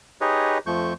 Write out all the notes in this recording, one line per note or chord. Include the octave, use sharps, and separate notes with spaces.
D#4 G4 G#4 B4 C#5 D#5
F2 F3 A3 C#6 G6